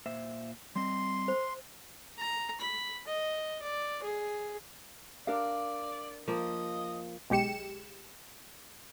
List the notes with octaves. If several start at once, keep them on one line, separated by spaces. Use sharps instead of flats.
A#2 C5 E5
G3 C4 D#5 C6
C5
A#5
B5
D#5
D5
G#4
D4 A#4 D5 F5
F3 A#3 D#5
B1 G#3 G4 C#7 E7